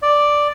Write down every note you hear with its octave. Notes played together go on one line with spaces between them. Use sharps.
D5